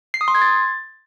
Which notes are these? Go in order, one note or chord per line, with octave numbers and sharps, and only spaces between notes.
C7
D#6
C6
G#6
A6